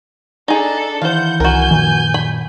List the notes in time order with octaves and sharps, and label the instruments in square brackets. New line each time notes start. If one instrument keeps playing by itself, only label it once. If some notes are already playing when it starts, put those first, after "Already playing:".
[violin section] D4 A4 [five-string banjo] D#4 G#4
[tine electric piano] D#3 E3 E4 [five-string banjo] C5 F5 [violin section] F#5 G6
[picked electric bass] C2 [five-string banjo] F#4 A#4 [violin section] G#5 G6
[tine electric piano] F#2 A#2 [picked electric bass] D#3 F3
[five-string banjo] B5